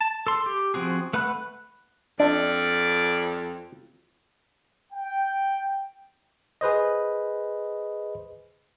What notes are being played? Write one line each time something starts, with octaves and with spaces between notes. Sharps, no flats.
A5
A4 C6
G4
F3 C4 F#4 G#4
A3 B4 F#5 B5 F#6
F2 D4 D5
G5
G#4 B4 C5 D#5